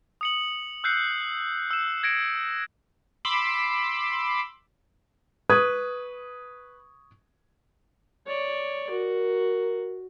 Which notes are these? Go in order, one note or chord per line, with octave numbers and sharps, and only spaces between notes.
D#6 C#7 F#7
E6 F#6 G6 C7 C#7
E6 E7
G#6 A#6 C#7 D7
B5 C6 D6 E6
B4 C#6 D#6 G#6
C#5 D5
F#4 A#4